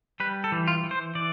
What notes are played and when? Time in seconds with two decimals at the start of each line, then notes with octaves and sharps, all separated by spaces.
0.20 G3 B4
0.44 A4
0.52 E3
0.68 F4
0.84 E3
0.91 C5
1.15 E3 D5